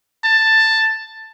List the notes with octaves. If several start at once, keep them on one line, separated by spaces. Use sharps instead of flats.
A5